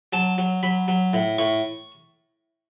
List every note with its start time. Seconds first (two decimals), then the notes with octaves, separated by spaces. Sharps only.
0.13 F#3 A5
0.38 F#3
0.63 F#3 B5
0.88 F#3
1.13 A2
1.38 A2 C#6